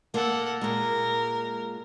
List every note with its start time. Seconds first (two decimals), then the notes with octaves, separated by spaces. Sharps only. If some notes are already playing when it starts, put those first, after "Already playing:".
0.14 A#3 A4 F#5
0.61 A#2 G#3 A#4